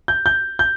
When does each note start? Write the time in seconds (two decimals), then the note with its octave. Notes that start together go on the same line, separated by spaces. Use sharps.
0.08 G6
0.26 G6
0.59 G6